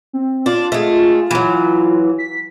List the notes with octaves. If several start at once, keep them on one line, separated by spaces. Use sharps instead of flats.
C4
D4 F4
G#3 A3
E3 F#3
B6